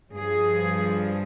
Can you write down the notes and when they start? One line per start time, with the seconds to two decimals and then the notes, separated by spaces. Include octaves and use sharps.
0.16 G2 F3 G#4